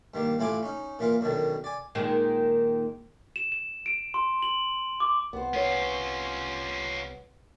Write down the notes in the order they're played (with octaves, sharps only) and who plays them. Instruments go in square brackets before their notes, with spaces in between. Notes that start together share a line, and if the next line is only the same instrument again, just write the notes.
[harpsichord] G2 D#3 A#3
A1 A2 E4 F4 G#5 D6
C#4 D#4
A#2 E3 F4 A#4
F#2 B2 D3 D#3
D5 G#5
[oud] A#2 D#3 G#3
[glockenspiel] E7
E7
D7
C6
F#7
D6
[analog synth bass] C2 [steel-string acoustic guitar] B3 C5
[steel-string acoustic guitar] B3 C#5 [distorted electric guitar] C#4 F4